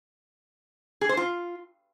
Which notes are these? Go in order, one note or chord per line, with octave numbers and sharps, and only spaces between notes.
G#4
C5
F4